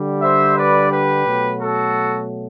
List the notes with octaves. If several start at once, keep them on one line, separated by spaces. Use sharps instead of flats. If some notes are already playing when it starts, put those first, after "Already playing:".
Already playing: D3 G3
C5 E5
B4 D5
G4 B4
B2 F#3 A3
F#4 A4